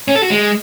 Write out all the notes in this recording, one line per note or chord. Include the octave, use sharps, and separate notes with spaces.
C#4
A4
F#4
G#3